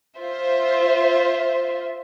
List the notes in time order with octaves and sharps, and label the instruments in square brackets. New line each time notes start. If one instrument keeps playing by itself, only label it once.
[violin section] F4 C5 E5